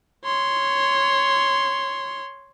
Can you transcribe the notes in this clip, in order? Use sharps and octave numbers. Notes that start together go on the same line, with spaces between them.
C#5 C6